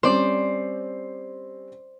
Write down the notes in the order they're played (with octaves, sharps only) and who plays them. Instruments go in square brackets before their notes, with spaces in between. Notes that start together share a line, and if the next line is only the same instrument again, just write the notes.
[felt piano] G3 C4 C#4 [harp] C5 D5